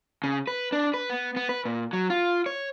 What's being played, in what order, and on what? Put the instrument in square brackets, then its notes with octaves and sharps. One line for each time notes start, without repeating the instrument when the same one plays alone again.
[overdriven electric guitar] C#3
B4
D4
B4
B3
B3
B4
A#2
F#3
F4
C#5